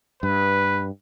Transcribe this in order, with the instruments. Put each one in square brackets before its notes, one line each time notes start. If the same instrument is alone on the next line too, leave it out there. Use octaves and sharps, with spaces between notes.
[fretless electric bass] G2 [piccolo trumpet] B4